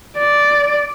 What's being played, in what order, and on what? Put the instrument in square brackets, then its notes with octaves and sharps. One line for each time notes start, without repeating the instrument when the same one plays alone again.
[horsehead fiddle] D5